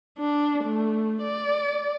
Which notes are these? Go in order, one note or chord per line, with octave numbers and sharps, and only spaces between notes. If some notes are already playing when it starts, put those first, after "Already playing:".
D4
A3
D5